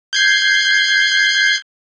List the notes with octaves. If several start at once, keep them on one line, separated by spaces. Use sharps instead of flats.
G6 G#6 C7